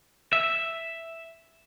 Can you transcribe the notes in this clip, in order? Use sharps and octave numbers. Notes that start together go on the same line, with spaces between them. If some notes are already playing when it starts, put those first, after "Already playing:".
E5